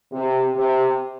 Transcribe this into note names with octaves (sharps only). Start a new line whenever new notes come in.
C3
C3